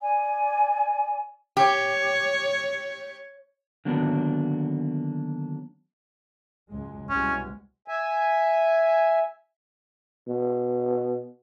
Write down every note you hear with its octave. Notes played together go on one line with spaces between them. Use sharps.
D5 G#5
G4 C#5
D3 D#3 F#3 A#3 B3 D4
C#2 F#2 G#3
C2 B2 G#3 C#4
E5 G#5
B2